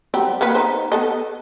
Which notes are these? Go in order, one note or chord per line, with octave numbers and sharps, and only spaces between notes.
F#3 G3 C4
A#3 B3 B4
D#4 C5
B3 A4 D#5